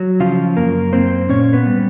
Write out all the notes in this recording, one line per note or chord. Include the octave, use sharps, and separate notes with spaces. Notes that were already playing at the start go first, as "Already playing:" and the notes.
Already playing: F#3
C#3 F3 F4
F#2 A#3 A#4
A#3 C4 C5
A#2 C#4 C#5
B3 B4
G3